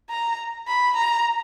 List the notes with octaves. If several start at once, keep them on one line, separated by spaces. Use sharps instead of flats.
A#5
B5
A#5